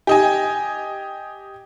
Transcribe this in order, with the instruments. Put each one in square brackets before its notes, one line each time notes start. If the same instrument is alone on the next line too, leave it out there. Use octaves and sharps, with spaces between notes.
[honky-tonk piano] G4 D#5 G#5